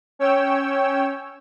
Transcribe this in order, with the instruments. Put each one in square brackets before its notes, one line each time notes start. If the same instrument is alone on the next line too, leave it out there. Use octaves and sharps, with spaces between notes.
[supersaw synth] C#4 C#5 G5 E6